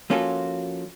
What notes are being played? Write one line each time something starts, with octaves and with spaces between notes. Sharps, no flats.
F3 A#3 C#4 F4 F#4 A4